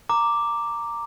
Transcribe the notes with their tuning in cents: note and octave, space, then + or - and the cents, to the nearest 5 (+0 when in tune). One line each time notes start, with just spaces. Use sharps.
A#5 -10 D6 +0